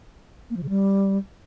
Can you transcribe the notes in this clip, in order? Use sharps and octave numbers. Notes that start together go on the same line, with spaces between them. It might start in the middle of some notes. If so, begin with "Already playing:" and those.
A#3
F3
C#3
G3